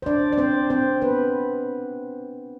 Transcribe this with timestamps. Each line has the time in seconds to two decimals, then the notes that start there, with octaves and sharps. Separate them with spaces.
0.02 C5
0.06 D4 D5
0.33 D5
0.38 C4 C5
0.70 C4 C5
1.02 B3 B4